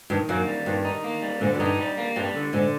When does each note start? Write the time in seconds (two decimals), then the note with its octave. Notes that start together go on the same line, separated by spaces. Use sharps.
0.10 G2 D#3
0.29 F#2 A#3
0.48 G3
0.66 G2 D#3
0.85 D#4
1.04 A#3
1.22 G3
1.40 G#2 D3
1.55 F#2
1.60 G2 D#4
1.79 G3
1.97 A#3
2.16 G2 G3
2.35 D3
2.53 G#2 D3